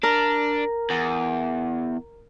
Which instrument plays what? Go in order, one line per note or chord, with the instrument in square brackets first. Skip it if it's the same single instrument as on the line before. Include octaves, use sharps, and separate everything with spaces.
[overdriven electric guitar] D4 [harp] A#4
[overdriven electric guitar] E2